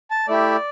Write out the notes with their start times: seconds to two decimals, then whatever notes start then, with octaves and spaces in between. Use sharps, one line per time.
0.10 A5
0.28 A3 E4 G4 D5